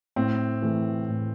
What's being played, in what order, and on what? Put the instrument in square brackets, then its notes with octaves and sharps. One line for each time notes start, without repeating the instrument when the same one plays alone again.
[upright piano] A2 [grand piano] C4
[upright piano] E3 A3 E4
A2